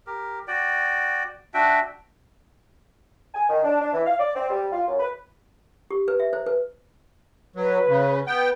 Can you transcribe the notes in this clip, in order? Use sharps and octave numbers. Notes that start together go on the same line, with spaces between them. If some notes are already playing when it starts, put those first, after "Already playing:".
G4 A#4
F#4 D5 G5
D4 F#4 E5 G5
G#5
D#3
D4
D4
E3
F5
D5
C4
G3
F4
F#2
B4
G4
B4
E5
C5
B4
F#3 B4
C#3
B3 G5